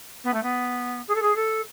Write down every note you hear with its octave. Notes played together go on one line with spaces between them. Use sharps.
B3
A3
B3
G#4
A4
G#4
A4